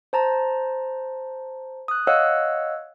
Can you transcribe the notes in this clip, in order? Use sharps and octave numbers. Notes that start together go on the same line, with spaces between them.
C5 A5 A#5
D#6 F#6
C#5 D#5 F5 F#5 E6 F#6